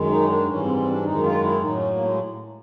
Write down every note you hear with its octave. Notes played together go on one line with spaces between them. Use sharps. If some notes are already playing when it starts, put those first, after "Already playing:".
Already playing: F#2 D#3 G#3
D#4
C#4
D4
G#2 E3 G3 C#4
C4
C4
D4
F#2 D#3 G#3 D#4
F4
E4
A2 F#3 D#4
C#4
A#3
G#3